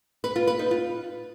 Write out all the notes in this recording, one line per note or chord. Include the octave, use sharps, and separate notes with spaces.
B4
F4
B4
D#4
F4